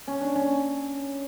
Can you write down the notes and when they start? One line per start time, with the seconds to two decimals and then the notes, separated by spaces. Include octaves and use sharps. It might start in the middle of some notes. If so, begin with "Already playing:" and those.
0.08 C#4
0.21 D4
0.35 C#4